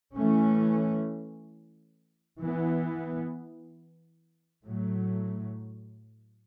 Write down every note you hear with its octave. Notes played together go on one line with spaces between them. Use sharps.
E3 A3 C#4
E3 B3
A2 F#3 A3